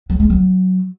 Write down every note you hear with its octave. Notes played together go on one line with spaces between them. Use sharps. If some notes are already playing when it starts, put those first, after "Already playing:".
F#3
G#3
F#3